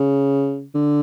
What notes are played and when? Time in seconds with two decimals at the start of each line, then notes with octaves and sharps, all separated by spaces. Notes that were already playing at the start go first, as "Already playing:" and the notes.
Already playing: C#3
0.75 D3